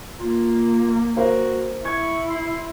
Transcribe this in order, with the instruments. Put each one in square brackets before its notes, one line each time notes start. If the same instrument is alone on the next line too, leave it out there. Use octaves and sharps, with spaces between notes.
[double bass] A#3 [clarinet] F4
[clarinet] F#4 [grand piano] A#4 C5 F5
[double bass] E4 [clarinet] C#6 [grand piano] G#6
[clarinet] C6